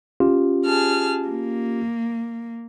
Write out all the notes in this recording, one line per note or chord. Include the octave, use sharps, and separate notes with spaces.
C#4 F4 G4
G#4 A5 F6
A#3